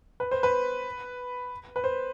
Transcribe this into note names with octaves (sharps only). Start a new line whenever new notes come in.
B4
C5
B4
B4
C5